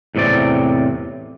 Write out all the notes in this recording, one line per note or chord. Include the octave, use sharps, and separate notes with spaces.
E2 A2 C3 C4 D5